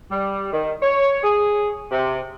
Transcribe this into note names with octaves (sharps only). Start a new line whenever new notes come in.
G3
D#3
C#5
G#4
C3